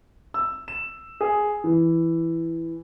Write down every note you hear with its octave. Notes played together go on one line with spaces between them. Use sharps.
E6
E7
G#4
E3